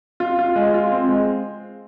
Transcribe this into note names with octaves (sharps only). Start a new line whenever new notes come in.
F4
F4
G#3
F4
C4
G#3